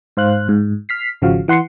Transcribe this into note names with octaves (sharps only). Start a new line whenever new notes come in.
G#2 C5 F5 F#6
G#2
F6 B6 C7
G#1 C#3 F3 F#4 F5
E3 F#5 C6 C7 C#7